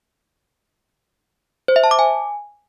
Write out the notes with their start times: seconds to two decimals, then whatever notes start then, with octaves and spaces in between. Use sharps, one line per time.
1.68 C5
1.76 E5
1.84 A5
1.91 D6
1.99 G#5